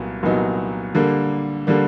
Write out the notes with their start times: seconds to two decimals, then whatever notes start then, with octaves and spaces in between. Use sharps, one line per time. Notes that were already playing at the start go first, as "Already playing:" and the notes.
Already playing: C2 A#2 F#3 B3
0.23 C2 A#2 F#3 B3 D#4
0.95 D3 G3 A#3
1.67 D3 G3 A#3